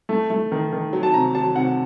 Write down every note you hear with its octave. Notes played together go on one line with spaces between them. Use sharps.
A3
A3
D#3
D#3
F#3
A5
C3 A#5
F#3 A5
C3 F#5